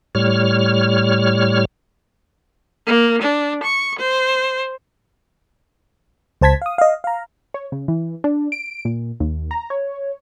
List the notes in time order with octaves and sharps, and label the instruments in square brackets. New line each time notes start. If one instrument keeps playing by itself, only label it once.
[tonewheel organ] A2 G3 C#5 F6
[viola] A#3
D4
C#6
C5
[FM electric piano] C#2 C5 A5 G#6 B6
F5 D#6
D#5 F5
F5 A#5
[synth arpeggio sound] C#5
C#3
E3
D4
D7
A#2
D#2
A#5
C#5